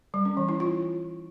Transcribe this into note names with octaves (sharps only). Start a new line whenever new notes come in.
G3
C#4
E3
E4
F4